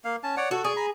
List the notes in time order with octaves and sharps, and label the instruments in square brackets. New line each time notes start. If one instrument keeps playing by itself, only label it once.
[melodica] A#3 F5
C#4 A5
C#5 D5 F#5
[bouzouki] F#4 [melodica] A4
[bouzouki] G#4 [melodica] D5 G#5 C#6
[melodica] A#5 B5